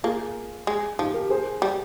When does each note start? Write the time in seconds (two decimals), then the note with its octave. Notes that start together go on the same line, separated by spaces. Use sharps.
0.04 A#3 F4 G#4
0.67 G#3
0.99 F3 D#4 G4
1.14 G4 A#4
1.30 G#4 C5
1.62 G3